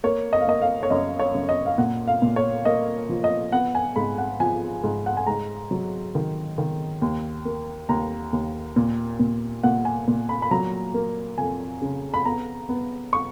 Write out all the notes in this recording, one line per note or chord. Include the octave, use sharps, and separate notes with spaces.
A#3 C#5
D#5
F5
A#3 D#5
F5
C#5
F#2 D#5
C#5
F#2
D#5
F5
A#2 F#5
F5
A#2
C#5
A#3 D#5
F3
D#5
B3 F#5
G#5
G#2 B5
F#5
F3 G#5
G#2
F#5
G#5
G#2 A#5
F#3
D#3
D#3
D#2
A#3
D#2 A#5
D#2
A#2
A#2
A#2 F#5
G#5
A#2
B5
B5
F#3 A#5
A#3
F2 G#5
C#3
B5
B3 A#5
B3
C#6